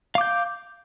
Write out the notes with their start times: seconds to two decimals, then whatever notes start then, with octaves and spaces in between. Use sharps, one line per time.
0.15 F5
0.18 D6
0.21 G6